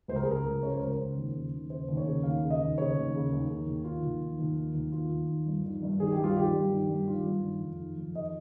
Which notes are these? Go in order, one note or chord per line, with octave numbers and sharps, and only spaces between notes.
C#2 C5
A#4
G#4
C#3 A#4
C#2
C#3 C#5
C5
C#2 A#4
C5
C#3
D#2
C#3
D#2
C#3 C5
D#2
C#5
C#3
D#2 F5
C#3
D#5
D#2
C#3 C#5
D#2
C#3
D#2
D#3
D#2
D#3 F4
D#2
D#3
D#2
D#3
D#2
D#3 F4
D#2
D#3
G2
D#3
G2
D#3 G#4
G4
G2
F4
D#3 G4
G2
D#3
G2
D#3 F4
G2
D#3
F2
D#3
F2
D#3 D#5